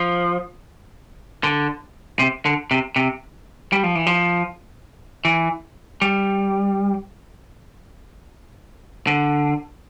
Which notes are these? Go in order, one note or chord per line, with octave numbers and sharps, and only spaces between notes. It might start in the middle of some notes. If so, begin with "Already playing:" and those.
Already playing: F3
D3
C3
D3
C3
C3
G3
F3
E3
F3
E3
G3
D3